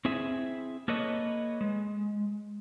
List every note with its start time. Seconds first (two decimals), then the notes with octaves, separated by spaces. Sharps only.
0.05 C4 E4 G#4 E5
0.88 A#3 A4 B4 C#5 D#5
1.61 G#3